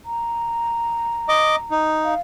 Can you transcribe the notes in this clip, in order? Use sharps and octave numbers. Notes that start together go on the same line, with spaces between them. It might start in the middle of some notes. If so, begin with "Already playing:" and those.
A#5
D#5 D6
D#4
F5